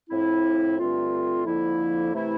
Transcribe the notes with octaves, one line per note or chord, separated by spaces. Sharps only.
A2 F3 C4 E4
G2 D3 A3 C4 F4
F2 D3 F3 A#3 E4
C3 E3 A3 E4